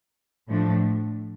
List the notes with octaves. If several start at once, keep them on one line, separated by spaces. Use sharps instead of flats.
A2 F3 A3 D4